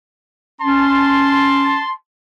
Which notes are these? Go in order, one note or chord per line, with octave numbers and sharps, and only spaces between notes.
C#4 A5 C6